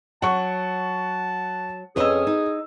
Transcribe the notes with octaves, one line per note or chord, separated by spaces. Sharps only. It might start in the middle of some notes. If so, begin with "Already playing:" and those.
F#3 F#5 A5 C#6
F2 C#4 G#4 B4 D#5 E6
D#4